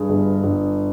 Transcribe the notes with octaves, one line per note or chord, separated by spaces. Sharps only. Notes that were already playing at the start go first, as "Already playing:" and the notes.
Already playing: G2 G#4
G1
G1